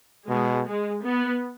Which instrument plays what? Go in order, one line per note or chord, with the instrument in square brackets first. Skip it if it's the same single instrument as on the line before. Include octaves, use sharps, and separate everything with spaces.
[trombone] B2 [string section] G#3
[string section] G#3
B3